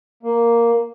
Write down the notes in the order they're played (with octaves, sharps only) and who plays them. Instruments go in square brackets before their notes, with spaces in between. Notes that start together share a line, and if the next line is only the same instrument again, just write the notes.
[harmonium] A#3